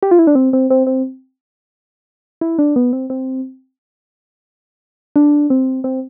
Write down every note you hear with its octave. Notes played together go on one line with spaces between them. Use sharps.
G4
F4
E4
D4
C4
C4
C4
C4
E4
D4
B3
C4
C4
D4
C4
C4